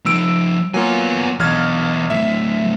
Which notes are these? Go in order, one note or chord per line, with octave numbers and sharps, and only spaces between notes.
F3 D#4 E6 D7
F#3 A#3 B3 F4 G#5
B1 E2 D#5 F6 G#6
A2 F#3 E5